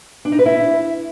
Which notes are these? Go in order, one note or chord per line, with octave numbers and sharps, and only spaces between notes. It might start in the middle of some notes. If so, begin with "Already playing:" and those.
D4
D#4
B4
E4